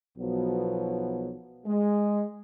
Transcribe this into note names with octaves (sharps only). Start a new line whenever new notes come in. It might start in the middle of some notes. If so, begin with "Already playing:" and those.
B1 B2 F3 F#3 B3
G#3